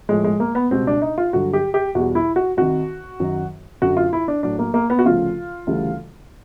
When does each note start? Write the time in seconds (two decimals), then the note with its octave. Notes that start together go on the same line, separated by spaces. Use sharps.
0.09 A2 F3 G#3
0.24 G#3
0.40 A#3
0.55 B3
0.71 C#2 B2 G3 C4
0.87 D4
1.02 D#4
1.18 F4
1.33 G2 D3 F#3 F#4
1.53 G4
1.74 G4
1.95 E2 B2 G3 F#4
2.15 E4
2.36 F#4
2.57 C2 C3 D#3 F#4
3.20 F#2 D#3 F#3
3.82 F#2 D3 F#3 F#4
3.97 F4
4.13 E4
4.28 D4
4.43 A2 F#3 D4
4.59 A#3
4.74 A#3
4.90 B3
4.99 F#4
5.05 D2 C#3 F3 F4
5.67 D2 C#3 E3 G3